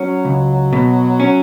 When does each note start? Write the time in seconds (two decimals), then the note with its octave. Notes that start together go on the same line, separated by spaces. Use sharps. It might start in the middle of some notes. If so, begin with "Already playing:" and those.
Already playing: F#3 C#4
0.25 C#2
0.73 B2
1.20 C#4